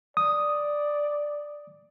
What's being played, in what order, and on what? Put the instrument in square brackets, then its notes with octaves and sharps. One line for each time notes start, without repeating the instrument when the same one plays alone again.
[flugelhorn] D5 [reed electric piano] D#6